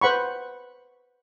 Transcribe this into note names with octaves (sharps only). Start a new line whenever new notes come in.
B4 C5 F#5 B5 C#6